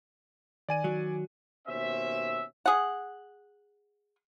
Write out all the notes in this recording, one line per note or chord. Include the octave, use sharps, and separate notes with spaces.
D#3 D5 G#5 D#7
F#3
D#2 B2 C#4 C5 E5
G#4 F#5